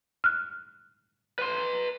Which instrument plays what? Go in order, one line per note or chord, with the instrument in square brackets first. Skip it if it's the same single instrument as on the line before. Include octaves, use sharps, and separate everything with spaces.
[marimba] F6 F#6
[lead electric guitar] B4 C6